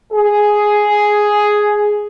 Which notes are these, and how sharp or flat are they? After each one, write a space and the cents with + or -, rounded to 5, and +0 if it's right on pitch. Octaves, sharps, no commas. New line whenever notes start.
G#4 +5